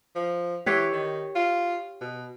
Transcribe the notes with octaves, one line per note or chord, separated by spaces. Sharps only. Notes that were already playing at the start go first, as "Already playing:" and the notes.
F3
E3 G4 C#5
D#3
F4
B2